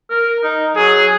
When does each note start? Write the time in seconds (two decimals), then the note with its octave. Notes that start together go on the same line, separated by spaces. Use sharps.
0.10 A#4
0.43 D#4
0.77 F#3 G#4